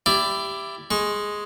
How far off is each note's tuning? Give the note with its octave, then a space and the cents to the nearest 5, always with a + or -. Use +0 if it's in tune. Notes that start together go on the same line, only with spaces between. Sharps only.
E4 +15 G4 +0 D5 +0
G#3 +0 C#6 -30